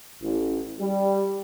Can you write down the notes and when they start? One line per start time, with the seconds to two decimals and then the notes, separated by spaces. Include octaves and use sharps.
0.22 A1
0.80 G3